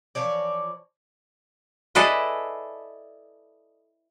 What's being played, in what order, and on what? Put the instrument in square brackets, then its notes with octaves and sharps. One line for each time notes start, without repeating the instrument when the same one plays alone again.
[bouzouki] E3 F3 C#5 D5
[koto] E4 G#4 A4 B4 D5 D#5